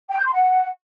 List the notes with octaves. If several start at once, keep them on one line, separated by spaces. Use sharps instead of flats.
G5
G6
C6
F#5